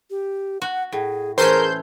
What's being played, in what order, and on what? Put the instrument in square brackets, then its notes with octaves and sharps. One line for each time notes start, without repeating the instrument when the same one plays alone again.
[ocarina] G4
[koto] F#4 [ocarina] F#5
[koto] A2 [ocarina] G#4
[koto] E3 A3 C#4 [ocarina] G#4 [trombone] A#4 [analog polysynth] C5 C6 G6